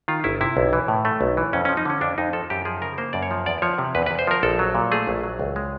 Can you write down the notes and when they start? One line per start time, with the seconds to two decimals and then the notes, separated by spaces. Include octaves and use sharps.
0.08 D#3 F4
0.24 G1 E4
0.41 C3 E4
0.57 B1
0.73 E3
0.88 A2
1.05 A3
1.21 B1
1.37 E3
1.53 F2 C#4
1.65 C#4
1.69 F3
1.77 D#4
1.85 D3 C#4
2.01 F2 D4
2.18 F2 D#4
2.33 F3 A4
2.50 F#2 G4
2.65 F3 G#4
2.82 C#3 A#4
2.98 A#3 C5
3.13 F#2 D5
3.23 C#5
3.31 F3
3.46 E2 D5
3.62 F3 C#5
3.78 C3
3.95 E2 B4
4.06 B4
4.11 E2
4.19 C5
4.27 F3 A#4
4.43 A#1 A4
4.59 F#3
4.75 A#2
4.92 A3 G#4
5.07 A#1
5.23 F#3
5.40 C#2
5.56 G#3